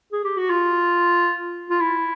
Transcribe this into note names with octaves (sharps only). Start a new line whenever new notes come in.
G#4
G4
F#4
F4
F4
E4